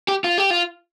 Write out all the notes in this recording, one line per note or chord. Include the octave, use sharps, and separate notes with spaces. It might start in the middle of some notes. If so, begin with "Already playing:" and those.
G4
F4
G4
F4